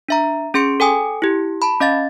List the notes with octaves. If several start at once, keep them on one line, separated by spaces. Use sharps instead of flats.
D4 E5 A#5
C#4 G#4 C6 C#7 D7
A4 G5 G#5 D#6
E4 G4
A5 B5
C#4 D#5 F5 A6